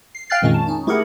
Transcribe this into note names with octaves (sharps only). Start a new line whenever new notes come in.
C7
F5 G5 F6 F#6 A6 C7
F2 A#2 D#3 G#3 A#3 C#4
A5
C#4 D#4
A3 E4 G4 G#4 A#4 F#5